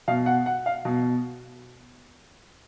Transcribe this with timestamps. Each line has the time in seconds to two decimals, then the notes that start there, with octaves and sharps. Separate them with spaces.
0.08 B2 F5
0.26 F#5
0.46 F#5
0.66 F5
0.85 B2